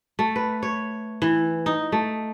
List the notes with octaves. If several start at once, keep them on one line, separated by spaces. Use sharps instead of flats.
A3
B4
C#5
E3
D#4
A3